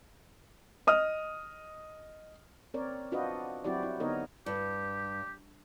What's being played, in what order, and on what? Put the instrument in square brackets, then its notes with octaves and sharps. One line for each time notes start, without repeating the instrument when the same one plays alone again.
[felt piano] D#5 D#6 F6
[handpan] C4 A#4 C#5 D5
D4 F4 F#4 B4 C5 D#5
F#3 C4 E4 F#4 G4 D5
E4
D3 B3 D#4 A#4 C#5 D#5
[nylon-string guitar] G2 [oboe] G4